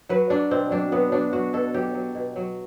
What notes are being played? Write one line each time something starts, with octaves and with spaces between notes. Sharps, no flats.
F#3 B4
F#3 D4
B2 C4
F#3 D4
F#3 B3
F#3 D4
F#3 F#4
B2 A4
F#3 G4
F#3
B2
F#3